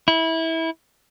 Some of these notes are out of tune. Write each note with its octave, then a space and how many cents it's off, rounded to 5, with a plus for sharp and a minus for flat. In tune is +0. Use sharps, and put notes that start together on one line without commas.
E4 -20